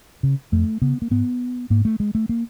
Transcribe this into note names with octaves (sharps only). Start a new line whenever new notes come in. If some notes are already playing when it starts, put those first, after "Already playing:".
C#3
F2 A3
C#3 B3
A#3
G#2 B3
G#2 A#3
A3
G#3
A3
A#3